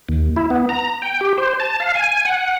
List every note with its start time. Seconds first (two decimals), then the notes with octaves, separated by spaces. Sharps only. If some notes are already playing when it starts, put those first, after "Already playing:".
0.09 D#2
0.36 E4
0.50 B3
0.69 A#5
1.02 G5
1.21 G4
1.38 C5
1.60 A5
1.80 F5
1.95 G#5
2.25 F#5